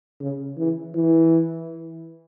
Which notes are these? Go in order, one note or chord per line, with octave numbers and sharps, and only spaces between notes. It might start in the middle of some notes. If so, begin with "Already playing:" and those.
C#3
E3
E3